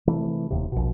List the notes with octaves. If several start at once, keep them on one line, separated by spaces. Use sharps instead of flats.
C3 E3 A3
D#1 D#2 C3
A#1 B2